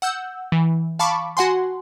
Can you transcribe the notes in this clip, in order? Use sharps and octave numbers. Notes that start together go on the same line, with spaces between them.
F#5 E6 G6
E3
F5 A5 B5 C#6 D6
F#4 F#5 G#5 C6